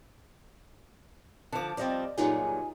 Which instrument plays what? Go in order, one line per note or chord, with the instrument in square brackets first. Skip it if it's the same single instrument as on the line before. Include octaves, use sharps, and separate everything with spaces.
[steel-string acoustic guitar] D3 F3 [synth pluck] A5 D6
[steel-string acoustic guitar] F3 G3 C4 [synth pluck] D5 D#5
[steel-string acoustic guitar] G2 A#2 F#3 [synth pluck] D#4 F4 G#4 [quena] G#5